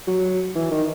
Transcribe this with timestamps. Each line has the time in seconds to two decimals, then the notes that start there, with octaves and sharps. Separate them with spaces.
0.07 F#3
0.55 E3
0.71 D#3